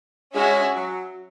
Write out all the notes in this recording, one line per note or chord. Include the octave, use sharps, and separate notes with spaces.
G#3 C#4 F#4 E5 G#5
F#3